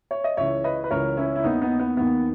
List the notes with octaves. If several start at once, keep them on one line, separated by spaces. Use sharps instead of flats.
C#5
D#5
C#2 C#3 E3 C#5 E5
B4 D#5
B4
C#2 C#3 E3 A#4 C#5
C#4 E4
E4
D#2 D#3 B3 D#4
B3 D#4
B3
D#2 D#3 B3